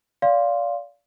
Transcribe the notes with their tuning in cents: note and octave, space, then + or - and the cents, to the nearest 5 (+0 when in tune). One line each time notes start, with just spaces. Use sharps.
D5 -30 F5 +0 C6 +5